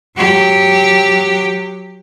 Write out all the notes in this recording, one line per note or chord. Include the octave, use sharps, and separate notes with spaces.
F#3 G4